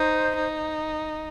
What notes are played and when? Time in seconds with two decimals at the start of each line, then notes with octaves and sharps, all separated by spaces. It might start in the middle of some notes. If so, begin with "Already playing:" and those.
Already playing: D#4 C5
0.36 D#4